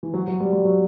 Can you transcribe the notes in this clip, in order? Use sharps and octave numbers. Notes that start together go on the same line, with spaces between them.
E3
F#3
F#3
G3
G3
F#3